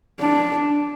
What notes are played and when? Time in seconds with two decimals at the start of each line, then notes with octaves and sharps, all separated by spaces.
0.20 D4